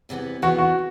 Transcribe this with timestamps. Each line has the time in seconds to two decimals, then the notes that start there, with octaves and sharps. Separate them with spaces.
0.09 E2 C3 E3 B3 E4
0.42 E2 C3 E3 B3 E4 F#4
0.59 F#4